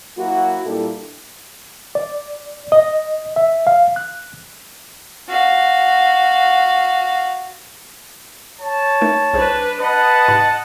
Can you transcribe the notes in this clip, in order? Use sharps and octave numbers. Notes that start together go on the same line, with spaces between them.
F#3 A#3 E4 F#4
A#2 G3 A#3 D4 E4 A4
D5
D#5
E5
F5
F#6
F#4 F5
C#5 A5
A3 D#4 A#4
C2 D4 G#4 B4 C5
B4 D#5 F#5 A5
G#2 C3 B5